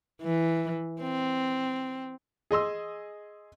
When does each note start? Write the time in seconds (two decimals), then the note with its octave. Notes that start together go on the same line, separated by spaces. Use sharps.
0.22 E3
1.02 C4
2.51 G#4 D#5 C6 E6